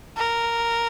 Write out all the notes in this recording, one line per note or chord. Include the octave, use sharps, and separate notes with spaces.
A#4